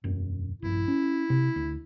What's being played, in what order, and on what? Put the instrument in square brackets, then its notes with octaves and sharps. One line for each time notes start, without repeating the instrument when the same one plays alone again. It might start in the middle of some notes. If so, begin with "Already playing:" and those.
[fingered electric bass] E1 F#2
[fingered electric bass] A#1 G2 [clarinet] E4
[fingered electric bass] C#4
C3
D2